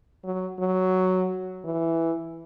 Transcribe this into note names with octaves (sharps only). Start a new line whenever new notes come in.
F#3
F#3
E3